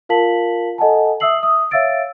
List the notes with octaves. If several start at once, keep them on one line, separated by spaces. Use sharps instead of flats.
F4 A#4 F5 A5 B6 F#7
A4 D#5 F#5 G#5 A5
E5 D#6 E6 C7 F#7
E5 D#6
C#5 E5 F5 E6 A6 D7